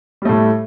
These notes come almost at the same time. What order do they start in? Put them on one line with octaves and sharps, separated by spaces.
G3 A3 A2